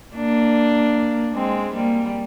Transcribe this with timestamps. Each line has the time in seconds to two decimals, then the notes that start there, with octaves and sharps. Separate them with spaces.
0.16 A#3 D4
1.35 G#3 C4
1.74 G3 A#3